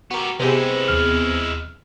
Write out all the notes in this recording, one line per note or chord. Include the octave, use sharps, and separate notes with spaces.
B3 F#4 G4 A#4
C3 G#3 B3 C4 E4 G4 G#4
D#2 F6